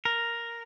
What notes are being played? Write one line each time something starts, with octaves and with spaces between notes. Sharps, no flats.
A#4